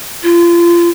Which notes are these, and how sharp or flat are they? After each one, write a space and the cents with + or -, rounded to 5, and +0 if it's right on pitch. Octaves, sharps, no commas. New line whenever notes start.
F4 -30